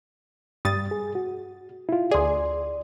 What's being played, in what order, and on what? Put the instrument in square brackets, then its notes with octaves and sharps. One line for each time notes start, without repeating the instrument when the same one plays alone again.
[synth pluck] G2 G3 A6 [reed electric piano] D#6
[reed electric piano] G#4
F#4
E4 F4
[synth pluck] D2 G#4 [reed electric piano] D5 C6